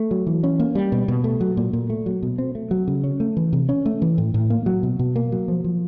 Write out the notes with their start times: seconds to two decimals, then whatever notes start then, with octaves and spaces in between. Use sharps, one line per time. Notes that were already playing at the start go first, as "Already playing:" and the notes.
Already playing: A3
0.11 F#3
0.27 E3
0.43 C#4
0.60 A#3
0.75 G3
0.92 B2
1.08 B2
1.24 A3
1.41 F#3
1.57 A#2
1.73 A#2
1.90 A3
2.06 F#3
2.23 B2
2.38 C4
2.55 A3
2.71 F#3
2.88 C#3
3.04 C#4
3.20 A3
3.37 E3
3.53 C3
3.69 C#4
3.86 A3
4.02 E3
4.18 A2
4.34 A2
4.50 A#3
4.66 F#3
4.83 B2
4.99 B2
5.16 A#3
5.32 F#3
5.48 F3
5.64 F3